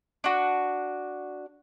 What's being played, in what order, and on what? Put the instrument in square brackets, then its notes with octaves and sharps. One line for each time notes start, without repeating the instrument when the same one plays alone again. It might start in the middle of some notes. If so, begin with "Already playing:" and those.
[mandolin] D4 F#4